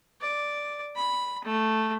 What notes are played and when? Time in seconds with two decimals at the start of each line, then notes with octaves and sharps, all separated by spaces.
0.21 D5
0.96 B5
1.44 A3